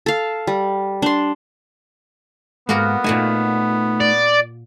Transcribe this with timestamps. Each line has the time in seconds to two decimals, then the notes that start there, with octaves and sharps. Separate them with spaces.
0.06 A4 F5
0.47 G3
1.02 D4 C6
2.69 G#2 A#3 B3 F#4 A#4
3.04 A#2 A3 D#4 F#4 G#5
4.00 D5